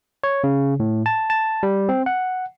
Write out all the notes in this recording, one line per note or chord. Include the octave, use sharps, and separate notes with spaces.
C#5
C#3
A2
A5
A5
G3
C4
F#5